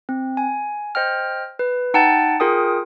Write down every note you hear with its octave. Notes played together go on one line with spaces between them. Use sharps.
C4
G#5
C5 D#5 G5 F6
B4
D#4 F#5 G5 A5 A6
F4 G#4 A#4 G5 D#6